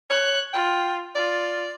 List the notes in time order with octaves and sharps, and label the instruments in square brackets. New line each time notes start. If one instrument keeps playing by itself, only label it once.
[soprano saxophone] C#5 [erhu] F#6
[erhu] F4 [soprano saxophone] G5
[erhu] F4 [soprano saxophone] D5